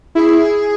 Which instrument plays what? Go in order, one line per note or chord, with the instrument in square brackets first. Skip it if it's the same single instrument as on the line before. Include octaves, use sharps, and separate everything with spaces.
[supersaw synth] E4 [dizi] G#4